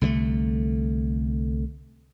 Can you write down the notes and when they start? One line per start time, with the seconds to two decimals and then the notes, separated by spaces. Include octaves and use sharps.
0.01 C2 D3 G3 A3